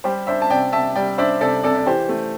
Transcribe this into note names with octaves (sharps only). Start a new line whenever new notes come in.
G3 G4 C5
D4 C5 E5
A5
C3 D5 G5
C3 E5 A5
G3 D5 G5
D4 C5 E5
C3 A4 D5
C3 A4 D5
D5
E3 G4 C5
A3